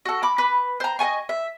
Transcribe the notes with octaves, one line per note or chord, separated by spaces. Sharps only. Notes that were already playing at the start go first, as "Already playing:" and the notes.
F#4 A4
B5 D6
B4
C5 A#5
D#5 F#5 G#5 C#6
E5